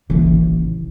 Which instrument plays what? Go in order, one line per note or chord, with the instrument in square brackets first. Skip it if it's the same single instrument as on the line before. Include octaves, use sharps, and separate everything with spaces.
[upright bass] D#1 A1 [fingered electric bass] C#3 E3